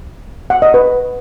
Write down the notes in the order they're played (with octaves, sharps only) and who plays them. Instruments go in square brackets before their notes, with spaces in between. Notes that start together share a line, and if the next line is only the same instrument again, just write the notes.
[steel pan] F#5
D#5
B4